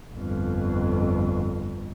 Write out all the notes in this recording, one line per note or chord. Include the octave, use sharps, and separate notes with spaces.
G1 F2